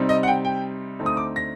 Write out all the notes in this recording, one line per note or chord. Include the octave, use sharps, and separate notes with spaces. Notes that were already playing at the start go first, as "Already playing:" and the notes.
Already playing: C3 G3 C4 D#4
D#5
F#5
G5
G5
D2 D3 A3 C4 D#4
D#6
D6
A#6